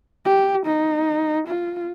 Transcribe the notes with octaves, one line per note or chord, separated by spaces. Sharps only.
G4
D#4
F4